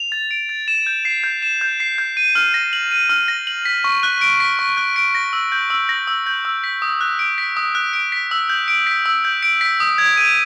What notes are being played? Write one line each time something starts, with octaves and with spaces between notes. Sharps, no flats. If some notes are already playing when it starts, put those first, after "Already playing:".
Already playing: F7
A6
D7
A6
E7
G6
C7
G6
E7
G6
C7
G6
D#7
F6
A#6
F#7
D#7
F6
A#6
F#7
B6
C#6
F#6
D7
B6
C#6
F#6
D7
A#6
E6
G6
E6
A#6
E6
G6
E6
B6
D#6
F#6
D7
B6
D#6
F#6
D7
B6
E6
G6
D7
B6
E6
G6
D7
B6
D#6
G#6
D#7